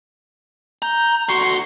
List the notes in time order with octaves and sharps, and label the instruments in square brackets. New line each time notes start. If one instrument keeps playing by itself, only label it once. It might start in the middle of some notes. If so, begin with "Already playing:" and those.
[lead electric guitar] A#5 [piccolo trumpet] G6
[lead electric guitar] D3 F#4 [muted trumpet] C6 [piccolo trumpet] C#6